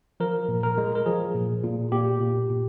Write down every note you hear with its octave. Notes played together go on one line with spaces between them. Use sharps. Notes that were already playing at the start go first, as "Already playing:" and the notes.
F3 A#4
A#2
A#4
G#3
A#4
F3 G#4
A#2
A#2
A#2 G4
A#2
A#2